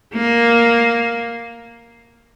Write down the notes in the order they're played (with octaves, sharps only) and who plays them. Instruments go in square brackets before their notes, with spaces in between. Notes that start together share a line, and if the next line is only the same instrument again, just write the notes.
[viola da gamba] A#3